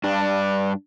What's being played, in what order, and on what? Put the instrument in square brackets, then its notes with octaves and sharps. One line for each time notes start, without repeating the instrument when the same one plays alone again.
[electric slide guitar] G2 D4